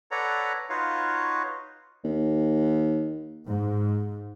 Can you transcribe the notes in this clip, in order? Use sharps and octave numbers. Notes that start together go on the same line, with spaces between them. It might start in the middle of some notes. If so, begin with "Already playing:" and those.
A4 B4 C#5 D5 F#5 A#5
D#4 F4 F#4 B4 C#5 F5
D#2
G#2